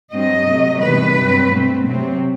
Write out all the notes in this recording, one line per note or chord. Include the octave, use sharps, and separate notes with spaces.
G2 F#3 C4 D#5
C3 F#3 A3
E2 C3 D#3 G3 B4
G2 F#3 C4
B2 A3 C4
C3 F#3 C4